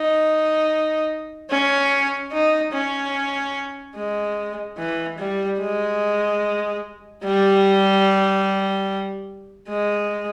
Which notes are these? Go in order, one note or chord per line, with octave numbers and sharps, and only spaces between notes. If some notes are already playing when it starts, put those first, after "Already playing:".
Already playing: D#4
C#4
D#4
C#4
G#3
E3
G3
G#3
G3
G#3